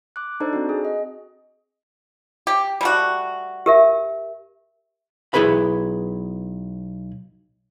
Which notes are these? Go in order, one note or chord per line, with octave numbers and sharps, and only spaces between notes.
D6 F#6
D4 D#4 A4 C5 D5
C4 F#4
G#4
D#5
G4
G3 A3 F#4
G4 A#4 E5
B1 E4 G#4 B4 B5